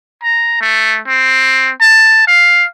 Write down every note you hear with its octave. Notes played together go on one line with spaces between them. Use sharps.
A#5
A3
C4
A5
F5